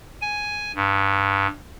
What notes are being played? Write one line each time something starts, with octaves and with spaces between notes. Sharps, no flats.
G#5
G2